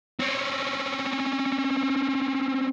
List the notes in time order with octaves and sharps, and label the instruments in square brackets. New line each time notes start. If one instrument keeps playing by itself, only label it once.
[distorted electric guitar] C4 C#4